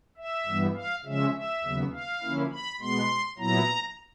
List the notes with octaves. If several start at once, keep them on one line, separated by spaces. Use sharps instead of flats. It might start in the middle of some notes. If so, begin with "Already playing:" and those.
E5
G2 E3 G3 B3
F5
C#3 F3 G#3 C#4 E5
E5
D#2 C#3 F#3 B3
F5
D3 F3 A#3 C#4 E4
B5
B2 G#3 B3 C6
A#2 F#3 B3 E4 A#5